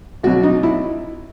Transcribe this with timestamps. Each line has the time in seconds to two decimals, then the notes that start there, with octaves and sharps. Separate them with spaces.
0.23 C2 B2 F#3 F#4
0.43 D#4
0.63 E4